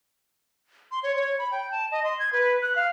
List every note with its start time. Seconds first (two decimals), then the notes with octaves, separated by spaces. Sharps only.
0.91 C6
1.03 C#5
1.16 C#5
1.39 B5
1.51 G5
1.71 A5
1.91 D#5
2.04 C6
2.19 G#6
2.33 B4
2.62 F#6
2.76 F5